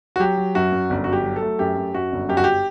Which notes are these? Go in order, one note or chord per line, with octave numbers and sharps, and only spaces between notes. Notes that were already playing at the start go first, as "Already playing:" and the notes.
F#4
F#3 G4
F#3
F#2 F#4
F#2
G1
F#3 F#4
G4
F#3
A4
A3
F#2 G4
F#2
F#2 F#4
G1
F#2 G4
F#4
G4